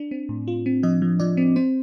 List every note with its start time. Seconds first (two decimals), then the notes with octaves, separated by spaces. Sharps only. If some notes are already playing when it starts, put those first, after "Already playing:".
Already playing: D4
0.11 C4
0.29 A2
0.48 F4
0.66 C4
0.83 F3 D#5
1.02 F3
1.20 F3 D5
1.37 C4
1.56 C4 C5